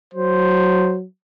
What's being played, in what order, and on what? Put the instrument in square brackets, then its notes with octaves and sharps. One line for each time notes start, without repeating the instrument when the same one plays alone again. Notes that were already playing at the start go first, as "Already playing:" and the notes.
[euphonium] F#3 [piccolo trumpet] C5